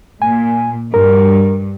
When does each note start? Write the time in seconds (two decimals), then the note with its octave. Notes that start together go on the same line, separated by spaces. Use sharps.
0.22 A#2 G#5
0.94 G2 A#4